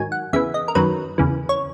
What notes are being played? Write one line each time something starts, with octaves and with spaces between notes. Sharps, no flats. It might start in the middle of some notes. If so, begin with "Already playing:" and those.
Already playing: G#2 D#3 F#3 G#5
F#5
E2 C#3 E3 E5
D#5
A#4
F#2 D#3 F#3 B4
E2 C#3 E3
C#5